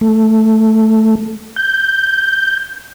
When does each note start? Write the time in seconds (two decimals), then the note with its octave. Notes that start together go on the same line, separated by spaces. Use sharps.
0.01 A3
1.56 G6